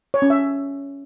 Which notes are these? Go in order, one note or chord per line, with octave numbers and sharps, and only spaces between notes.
C#5
C#4
E5